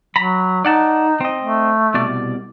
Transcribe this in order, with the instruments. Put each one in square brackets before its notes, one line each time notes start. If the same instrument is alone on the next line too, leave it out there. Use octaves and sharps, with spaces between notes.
[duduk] F#3 [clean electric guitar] A#5 B5
[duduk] D#4 [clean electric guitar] D5 F#5 A5
[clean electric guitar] C4 D#5
[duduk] A3
[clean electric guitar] C2 B2 D5